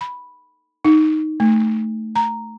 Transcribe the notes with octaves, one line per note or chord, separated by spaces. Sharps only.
B5
D#4
A3
A#5